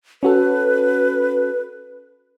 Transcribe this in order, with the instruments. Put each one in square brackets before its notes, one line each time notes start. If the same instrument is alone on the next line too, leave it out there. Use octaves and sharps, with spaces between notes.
[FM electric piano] C#4 F#4 A4 [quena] B4